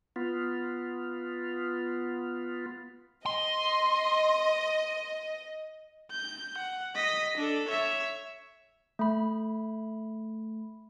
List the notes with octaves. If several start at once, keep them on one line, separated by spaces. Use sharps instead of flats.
B3 F4
D#5 C6
G6
F#5
D#5 B6
D4 A4
C#5 E5
A3 B5